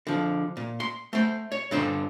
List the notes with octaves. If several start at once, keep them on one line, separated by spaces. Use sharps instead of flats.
D3 F3
A#2
C6
A3 C5
C#5
G2 D3 F4 C5